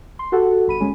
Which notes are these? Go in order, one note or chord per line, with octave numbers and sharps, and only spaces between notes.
C6
F#4 G4 A4 F#5
G1 B5 D#7
G#3 C#4